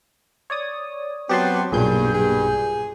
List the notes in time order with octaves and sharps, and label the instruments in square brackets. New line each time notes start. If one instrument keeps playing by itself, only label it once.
[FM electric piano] C#5 D5 D#6
[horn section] F#3 B3 [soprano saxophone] C4 [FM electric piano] G4 A5 C6
[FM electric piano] B1 A#2 G6 [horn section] G2 [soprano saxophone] G#4
[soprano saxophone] G#4